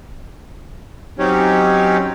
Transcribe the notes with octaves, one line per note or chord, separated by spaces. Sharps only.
F#3 C4 C#4 D#4 G4 C#5